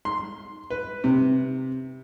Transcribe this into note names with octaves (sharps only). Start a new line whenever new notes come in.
C6
B4
C3